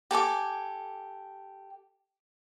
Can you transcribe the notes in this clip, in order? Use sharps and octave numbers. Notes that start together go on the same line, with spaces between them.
G4 A4 G#5 D6